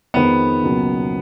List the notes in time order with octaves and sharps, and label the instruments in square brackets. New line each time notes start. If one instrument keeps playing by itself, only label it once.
[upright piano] F2 D#3 G#3 [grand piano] B3
[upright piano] C#2 B2 F#3 A#3